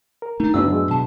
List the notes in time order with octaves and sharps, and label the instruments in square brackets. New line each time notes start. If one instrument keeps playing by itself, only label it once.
[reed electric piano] A#4
[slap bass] A3 D4 [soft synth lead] D#4
[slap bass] F#2 A2 [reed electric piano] C#3 F#4 [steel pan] B3 D4 E4 [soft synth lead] E6
[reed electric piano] F#3 G#3
[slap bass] B2 [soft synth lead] A5